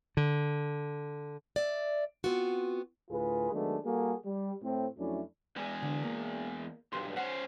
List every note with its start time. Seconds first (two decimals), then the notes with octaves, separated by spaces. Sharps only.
0.17 D3
1.56 D5 E5
2.24 B3 C4 F4 F#4
3.11 D2 A2 F4 G#4 B4
3.52 D#3 F#3 G#3 A3 B3 D4
3.85 G3 A#3 F#4 G#4 A4
4.25 G3
4.62 A2 C4
4.98 F2 F#3 A3 C#4 D4 E4
5.56 E2 G#3
5.82 D3
6.04 A#3
6.93 B1 G2 C6
7.17 C#4 C5 F#5